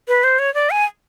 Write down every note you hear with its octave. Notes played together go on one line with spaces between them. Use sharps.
B4
C5
C#5
D5
G#5